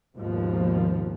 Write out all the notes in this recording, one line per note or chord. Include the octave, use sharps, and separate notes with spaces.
G#1 D#2 B2 F3